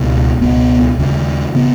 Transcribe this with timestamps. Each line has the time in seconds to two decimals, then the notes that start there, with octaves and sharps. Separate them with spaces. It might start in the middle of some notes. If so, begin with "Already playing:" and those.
Already playing: C#2 B2
0.41 C#2 B2 B3
0.99 D#2 C#3
1.55 C#3 B3